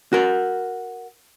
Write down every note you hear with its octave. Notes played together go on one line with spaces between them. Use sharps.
F#4 A#4